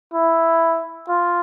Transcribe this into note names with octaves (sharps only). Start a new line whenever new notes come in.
E4
F4